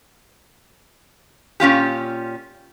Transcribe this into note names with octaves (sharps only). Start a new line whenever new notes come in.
A#2 C#4 F4 G4